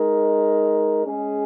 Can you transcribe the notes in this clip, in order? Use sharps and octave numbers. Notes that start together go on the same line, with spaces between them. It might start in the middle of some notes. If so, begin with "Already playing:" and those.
Already playing: G#3 D#4 A#4
G#3 C#4 G#4